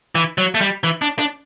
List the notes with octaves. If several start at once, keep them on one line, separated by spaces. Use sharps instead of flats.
E3
F#3
A3
G3
E3
D4
D4